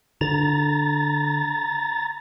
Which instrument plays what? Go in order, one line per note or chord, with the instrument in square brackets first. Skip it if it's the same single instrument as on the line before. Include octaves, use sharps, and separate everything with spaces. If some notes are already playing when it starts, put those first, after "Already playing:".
[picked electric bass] D3 [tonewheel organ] A#5 A6